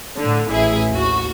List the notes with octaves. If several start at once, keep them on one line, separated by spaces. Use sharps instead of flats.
A2 D3
A1 E4 G#4
D#2 F#4